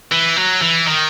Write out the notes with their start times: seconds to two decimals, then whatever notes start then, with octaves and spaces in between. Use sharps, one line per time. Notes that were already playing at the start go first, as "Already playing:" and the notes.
0.12 E3
0.36 F#3
0.62 E3
0.87 D#3